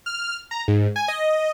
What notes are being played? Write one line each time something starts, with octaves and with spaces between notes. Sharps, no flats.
F6
A#5
G#2
G#5
D#5